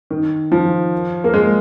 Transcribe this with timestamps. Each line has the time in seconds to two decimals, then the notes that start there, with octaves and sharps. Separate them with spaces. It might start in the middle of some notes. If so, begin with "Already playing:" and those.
0.11 D#3
0.52 F3
1.24 A#3
1.34 G#3